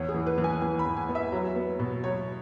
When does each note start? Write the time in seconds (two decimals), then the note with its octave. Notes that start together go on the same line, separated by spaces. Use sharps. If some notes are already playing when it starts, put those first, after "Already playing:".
Already playing: E2 C#5
0.09 G#4
0.14 E3
0.27 B4
0.38 E3
0.44 G#5
0.62 E3 G#5
0.79 B5
0.85 E2
0.97 G#5
1.09 B3
1.15 E5
1.32 F#3
1.56 B3
1.79 B2
2.03 F#3 C#5